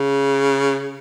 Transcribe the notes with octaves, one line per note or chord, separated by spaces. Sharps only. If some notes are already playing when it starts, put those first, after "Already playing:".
Already playing: C#3